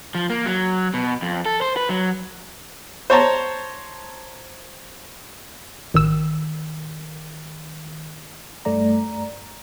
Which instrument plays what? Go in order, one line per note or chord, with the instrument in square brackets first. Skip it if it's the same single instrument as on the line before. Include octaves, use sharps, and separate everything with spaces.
[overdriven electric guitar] F3
A#3
F#3
B2
F2
A4
C5
B4
F#3
[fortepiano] C5 C#5 A5 A#5
[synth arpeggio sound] A1 E6 [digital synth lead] D#3
[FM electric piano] G2 A3 D5 A#5